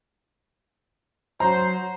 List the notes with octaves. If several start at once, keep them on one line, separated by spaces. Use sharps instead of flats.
F#3 C5 A#5